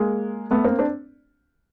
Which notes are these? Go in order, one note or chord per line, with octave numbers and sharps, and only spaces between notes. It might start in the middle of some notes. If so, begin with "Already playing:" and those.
Already playing: G#3 A#3
A3 B3
A#3 C4
C4 D4